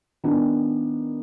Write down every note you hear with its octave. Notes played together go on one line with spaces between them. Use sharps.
D#3 B3 D4